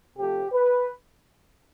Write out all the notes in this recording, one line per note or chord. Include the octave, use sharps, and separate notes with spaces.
C3 F3 A3 G4
B4